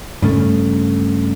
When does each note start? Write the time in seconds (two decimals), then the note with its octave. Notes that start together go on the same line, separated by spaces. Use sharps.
0.22 G2 C#3 A3